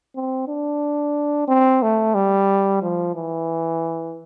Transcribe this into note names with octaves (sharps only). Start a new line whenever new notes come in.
C4
D4
C4
A3
G3
F3
E3